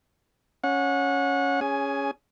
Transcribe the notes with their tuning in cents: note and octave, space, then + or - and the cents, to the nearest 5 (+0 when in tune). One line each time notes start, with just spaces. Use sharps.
C#4 +0 F#5 -25
C#4 +5 G#4 -10 G#5 +15